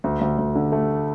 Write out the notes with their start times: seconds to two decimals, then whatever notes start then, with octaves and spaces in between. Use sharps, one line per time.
0.04 D2
0.21 D2
0.38 D2
0.55 D3
0.72 A3